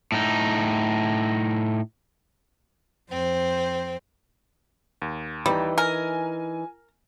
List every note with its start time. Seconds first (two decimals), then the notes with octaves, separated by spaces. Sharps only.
0.12 A2 D#4
3.10 F2 C4 C5
5.02 D#2
5.46 E3 G3 D#4
5.78 A#4 G#5